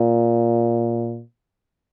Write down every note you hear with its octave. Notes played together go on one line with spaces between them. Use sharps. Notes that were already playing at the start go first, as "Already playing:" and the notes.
Already playing: A#2